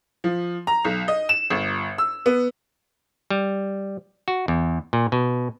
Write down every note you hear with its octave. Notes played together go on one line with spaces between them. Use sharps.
F3
A#5
B1
D#5
E7
G1
E6
B3
G3
F#4
E2
A#2
B2